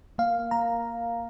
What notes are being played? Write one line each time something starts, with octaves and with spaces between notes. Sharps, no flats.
A#3 F5
A#3 A#5